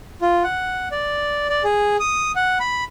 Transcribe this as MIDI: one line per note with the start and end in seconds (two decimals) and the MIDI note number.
0.21 0.43 65
0.44 0.89 78
0.92 1.47 74
1.49 1.63 74
1.64 1.97 68
2.00 2.32 87
2.36 2.58 78
2.60 2.84 83